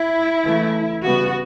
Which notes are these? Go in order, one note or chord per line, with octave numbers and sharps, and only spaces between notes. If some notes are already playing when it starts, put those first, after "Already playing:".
Already playing: E4
C#3 E3 A3
C#3 G3 B3 F#4